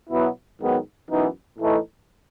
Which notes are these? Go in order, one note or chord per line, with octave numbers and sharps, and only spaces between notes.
B2 F#3 B3 E4
G#2 D#3 F#3 B3
F#2 E3 B3 D#4
A2 E3 A3 D#4